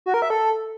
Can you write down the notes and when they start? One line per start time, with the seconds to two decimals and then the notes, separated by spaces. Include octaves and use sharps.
0.06 F#4
0.14 A#4
0.22 E5
0.30 A4